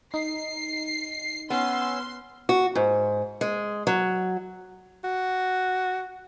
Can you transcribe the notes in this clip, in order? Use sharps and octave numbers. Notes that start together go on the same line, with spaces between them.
D#4 C7
B3 C#4 C6 E6
F#4
G#2
G#3
F#3
F#4